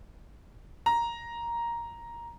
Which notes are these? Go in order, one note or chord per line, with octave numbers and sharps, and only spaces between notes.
A#5